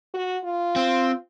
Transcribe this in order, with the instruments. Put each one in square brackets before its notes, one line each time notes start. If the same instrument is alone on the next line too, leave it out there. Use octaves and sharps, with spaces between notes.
[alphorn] F#4
F4
[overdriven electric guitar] C4